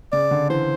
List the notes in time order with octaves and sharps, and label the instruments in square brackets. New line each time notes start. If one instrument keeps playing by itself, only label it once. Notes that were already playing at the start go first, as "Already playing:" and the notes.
[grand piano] C#3 [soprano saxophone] D5
[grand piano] D3
[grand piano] E3 [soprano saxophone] C5